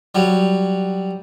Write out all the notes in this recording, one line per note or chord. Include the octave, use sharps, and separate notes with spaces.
F#3 G3